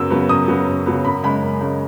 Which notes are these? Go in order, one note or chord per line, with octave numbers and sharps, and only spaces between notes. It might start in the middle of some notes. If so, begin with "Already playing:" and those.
Already playing: F#2 C#3 F#3 B3 E6
C#3 F#3 B3
F#2 D#6
C#3 F#3 B3
F#2
C#3 F#3 B3
F#2 B5
C#3 G#3 B5
F#2
C#3 G#3